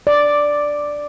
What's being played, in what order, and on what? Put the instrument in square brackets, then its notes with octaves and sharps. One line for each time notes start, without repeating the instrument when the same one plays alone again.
[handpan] D5